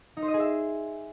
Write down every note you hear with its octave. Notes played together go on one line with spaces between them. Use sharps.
D#4
C5
D#5
G#4
E5